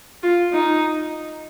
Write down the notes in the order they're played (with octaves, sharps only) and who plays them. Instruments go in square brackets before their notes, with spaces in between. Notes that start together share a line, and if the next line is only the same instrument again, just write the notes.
[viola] F4
D#4